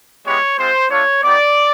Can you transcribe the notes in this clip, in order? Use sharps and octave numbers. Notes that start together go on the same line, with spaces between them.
G#3 B3 E4 G4 C#5
G#3 C4 F4 C5
A3 D4 F4 C#5
B3 D#4 G4 D5